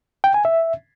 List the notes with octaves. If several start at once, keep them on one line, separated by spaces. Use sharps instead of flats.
G5
G#5
E5